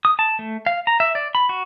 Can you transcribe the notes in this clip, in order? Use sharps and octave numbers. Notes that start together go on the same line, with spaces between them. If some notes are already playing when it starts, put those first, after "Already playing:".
D#6
A5
A3
F5
A#5
E5
D5
B5
F#4